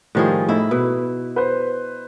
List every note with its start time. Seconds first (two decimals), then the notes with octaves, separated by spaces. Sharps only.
0.15 A2 D#3 F3 G3 G#4
0.49 A2 D#4 E4
0.71 B2 B4
1.36 B4 C5